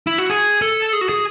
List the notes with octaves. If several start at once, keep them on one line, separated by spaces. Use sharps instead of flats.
E4
F#4
G#4
A4
G#4
F#4
G#4